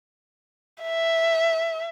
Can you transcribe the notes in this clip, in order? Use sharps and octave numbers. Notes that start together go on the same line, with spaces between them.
E5